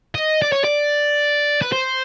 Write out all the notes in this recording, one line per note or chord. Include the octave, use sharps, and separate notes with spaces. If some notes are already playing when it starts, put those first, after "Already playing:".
D#5
D5
C#5
D5
B4
C5